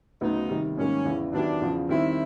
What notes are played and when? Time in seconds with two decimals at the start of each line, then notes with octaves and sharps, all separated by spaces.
0.21 D2 C#3 F#3 B3 D#4
0.49 C3 D#3 G3
0.77 G#2 D#3 G3 A#3 C#4
1.05 E2 C#3 E3
1.32 D#3 F#3 B3 D4 E4 G4
1.61 E2 C#3 F3
1.89 D#3 G3 C4 E4